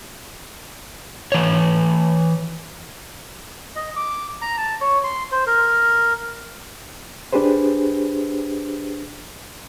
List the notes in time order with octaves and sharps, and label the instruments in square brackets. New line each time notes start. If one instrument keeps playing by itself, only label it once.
[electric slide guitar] E3 C#5
[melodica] D#5
D6
A#5
A5
C#5
C6
C5
A#4
[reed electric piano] D4 G4 G#4 B4 C5